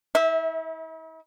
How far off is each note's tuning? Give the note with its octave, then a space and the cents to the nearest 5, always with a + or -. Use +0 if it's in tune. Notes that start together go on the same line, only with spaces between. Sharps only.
E4 -45 E5 -20